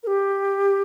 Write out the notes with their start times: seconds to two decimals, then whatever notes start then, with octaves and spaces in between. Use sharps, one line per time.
0.03 A#4
0.07 G4